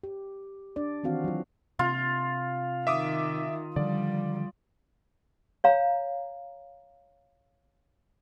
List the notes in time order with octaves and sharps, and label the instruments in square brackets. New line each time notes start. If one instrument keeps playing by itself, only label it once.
[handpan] G4
D4 D5
D#3 E3 C4 F#4 F5
F#3 F4
[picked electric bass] C3 [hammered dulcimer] F4
[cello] D#3 [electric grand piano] E5 D6 D#6
[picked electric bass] D3 D#3 F3 [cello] G3 [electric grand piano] D5
[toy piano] C#5 F5 A#5